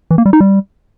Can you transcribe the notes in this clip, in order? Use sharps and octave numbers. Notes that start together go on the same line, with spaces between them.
E3
A#3
G3
D#4
G3